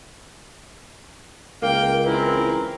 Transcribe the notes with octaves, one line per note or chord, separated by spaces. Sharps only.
C#2 A#3 F5 G5
E3 C4 E4 A#4